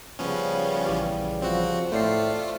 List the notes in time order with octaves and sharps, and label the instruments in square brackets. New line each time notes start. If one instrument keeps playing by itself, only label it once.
[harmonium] C#3 G3 [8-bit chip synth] F3 B3 C#4
[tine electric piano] A#1 E3 G4
[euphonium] F3 [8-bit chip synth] C4 F#4
[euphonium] A2 [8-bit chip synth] A3 F4 [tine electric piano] C5 D5 C7